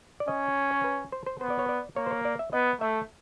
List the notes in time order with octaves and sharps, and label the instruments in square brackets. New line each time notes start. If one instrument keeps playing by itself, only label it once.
[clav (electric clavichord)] D5
[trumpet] C#4 [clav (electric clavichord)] D#5
[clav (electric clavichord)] C#5
B4
C5
C5
[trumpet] B3 [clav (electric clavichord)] C5
[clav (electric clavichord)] D5
C#5
D5
[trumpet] A#3 [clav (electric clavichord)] C#5
[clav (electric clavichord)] C5
C#5
D5
E5
[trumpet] B3 [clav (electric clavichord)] D#5
[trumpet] A3 [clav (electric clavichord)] E5